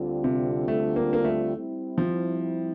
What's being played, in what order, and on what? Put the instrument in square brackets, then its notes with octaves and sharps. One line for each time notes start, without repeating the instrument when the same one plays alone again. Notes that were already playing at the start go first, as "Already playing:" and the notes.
Already playing: [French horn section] D2 D3 G3 C4 F4
[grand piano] C3
A3
A#3
A#3
A3
[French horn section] G3 C4 E4
[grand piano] F3